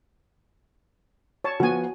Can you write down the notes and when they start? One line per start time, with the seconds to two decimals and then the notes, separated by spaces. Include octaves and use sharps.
1.44 C#5 A5
1.60 F3 B3 F#4 G#5